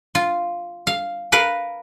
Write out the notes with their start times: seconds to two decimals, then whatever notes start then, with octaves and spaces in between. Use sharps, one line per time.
0.15 F4
0.87 F5
1.32 A#4 B4 F5